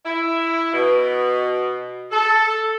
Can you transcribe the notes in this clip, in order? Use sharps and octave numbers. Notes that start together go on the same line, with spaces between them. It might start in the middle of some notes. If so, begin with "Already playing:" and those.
E4
B2
A4